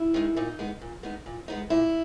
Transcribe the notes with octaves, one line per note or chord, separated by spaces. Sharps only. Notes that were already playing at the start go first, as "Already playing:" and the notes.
Already playing: E4
D#3 G#3 D#4
A#2 D#4
G#3 B3 D#4
A#2
G#3 B3 D#4
A#2
G#3 B3 D#4
A#2 E4